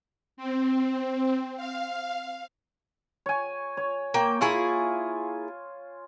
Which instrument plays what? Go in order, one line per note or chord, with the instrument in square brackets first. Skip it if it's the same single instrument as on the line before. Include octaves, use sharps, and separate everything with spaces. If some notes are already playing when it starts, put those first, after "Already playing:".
[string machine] C4
F5
[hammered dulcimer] C#5 G#5
C#5
[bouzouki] A#3 G5
[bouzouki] A#3 E4 G#4 [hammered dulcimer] F4 G#5 C#6